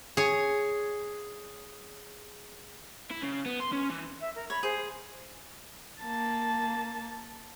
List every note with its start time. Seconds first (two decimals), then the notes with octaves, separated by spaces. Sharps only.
0.17 G#4 C#5
3.11 E4
3.23 C#3
3.46 B3
3.60 C6
3.73 C#4
3.90 E3
4.21 E5
4.35 A#4
4.50 C#5 B5
4.63 G#4 C5
6.01 A#3 A5